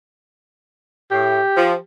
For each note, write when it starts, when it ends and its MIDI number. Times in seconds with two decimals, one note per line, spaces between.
1.11 1.39 45
1.11 1.79 67
1.56 1.74 53